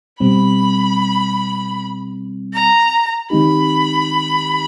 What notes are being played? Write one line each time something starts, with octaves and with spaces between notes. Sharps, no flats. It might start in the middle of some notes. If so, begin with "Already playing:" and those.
B2 G3 C4 B5
A#5
D#3 G#3 C4 D#4 G4 B5